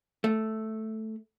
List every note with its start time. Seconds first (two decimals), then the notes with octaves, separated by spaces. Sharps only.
0.24 A3